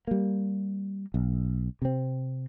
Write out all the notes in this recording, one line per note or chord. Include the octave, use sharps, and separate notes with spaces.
G3 A#3
B1
C3 C4